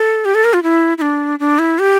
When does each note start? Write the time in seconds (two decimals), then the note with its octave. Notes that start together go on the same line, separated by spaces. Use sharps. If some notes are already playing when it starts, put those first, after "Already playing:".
Already playing: A4
0.25 G4
0.35 A4
0.44 A#4
0.53 F4
0.63 E4
0.98 E4
1.02 D4
1.39 D4
1.59 E4
1.79 G4